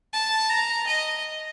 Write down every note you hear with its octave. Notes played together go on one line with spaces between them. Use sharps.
A5
A#5
D#5